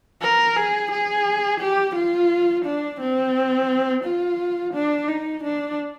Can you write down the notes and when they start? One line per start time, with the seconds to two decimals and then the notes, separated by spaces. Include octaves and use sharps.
0.22 A#4
0.56 G#4
0.92 G#4
1.61 G4
1.96 F4
2.65 D4
3.00 C4
4.05 F4
4.74 D4
5.09 D#4
5.44 D4